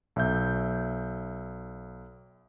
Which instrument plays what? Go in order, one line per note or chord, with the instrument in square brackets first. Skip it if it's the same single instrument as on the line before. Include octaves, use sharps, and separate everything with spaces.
[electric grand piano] B1 E5 G6